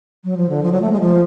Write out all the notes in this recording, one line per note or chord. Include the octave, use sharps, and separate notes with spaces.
F#3
F3
D3
F3
F#3
A3
G#3
F3